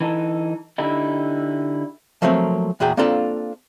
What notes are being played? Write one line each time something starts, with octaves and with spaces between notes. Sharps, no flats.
E3 D#4 A4
D3 D#4 E4 G4
F3 F#3 A3 A#3 C4
E2 A#2 F#4 G#4 G5
A#3 C4 D4 F4 A4 D5